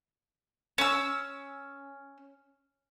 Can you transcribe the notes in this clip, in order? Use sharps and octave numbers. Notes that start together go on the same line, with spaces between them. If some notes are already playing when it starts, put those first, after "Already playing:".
C#4 E6